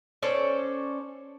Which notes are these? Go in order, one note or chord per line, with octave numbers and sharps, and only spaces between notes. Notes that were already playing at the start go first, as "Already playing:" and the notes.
C#4 A4 C5 D5